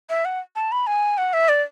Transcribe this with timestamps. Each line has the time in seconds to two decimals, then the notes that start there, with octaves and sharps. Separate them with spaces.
0.10 E5
0.25 F#5
0.56 A5
0.72 B5
0.87 G#5
1.18 F#5
1.33 E5
1.49 D5